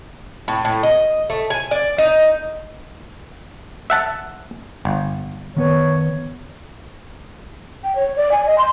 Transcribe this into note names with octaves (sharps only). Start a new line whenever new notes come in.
A2
A2
D#5
A3
G#5
D5
D#4
E5 F#5 A5
G1
D#3 B3 B4 C#5
G5
C#5
D5
G#5
D#5
C6